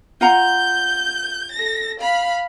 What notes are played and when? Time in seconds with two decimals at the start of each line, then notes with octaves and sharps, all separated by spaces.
0.21 F4 F#5 A#5 G6
1.52 A4 A#6
2.00 F5 B5